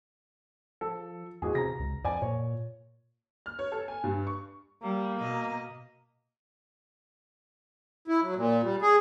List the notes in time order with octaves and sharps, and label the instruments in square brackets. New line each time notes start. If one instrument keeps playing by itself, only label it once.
[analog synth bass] F3 [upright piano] A4
[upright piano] A1 F#4 G#4 [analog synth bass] E2
[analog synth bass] C3 [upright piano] A#5 A#6
[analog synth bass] C#2
[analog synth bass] F2 [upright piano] D5 G#5
[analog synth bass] A#2 [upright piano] C#5
[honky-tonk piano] F6
C#5
A4
G#5
G2
C#6
[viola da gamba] G3 [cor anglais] A#3
[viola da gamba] B2 B3 D#5
[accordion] E4
F#3
A#2
G3
G#4